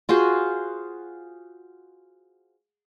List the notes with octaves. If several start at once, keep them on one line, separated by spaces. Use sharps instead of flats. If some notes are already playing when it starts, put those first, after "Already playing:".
F4 F#4 G#4 C5